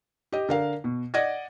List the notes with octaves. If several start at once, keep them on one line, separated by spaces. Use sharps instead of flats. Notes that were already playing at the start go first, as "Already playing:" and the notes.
G4 D#5
D3 A#4 F5
B2
D5 D#5 F#5 G#6 A#6